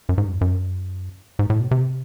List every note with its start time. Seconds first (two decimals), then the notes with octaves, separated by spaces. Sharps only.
0.09 F#2
0.18 G#2
0.25 G2
0.29 F#2
0.33 F2
0.41 F#2
1.39 G#2
1.50 A2
1.60 B2
1.71 C3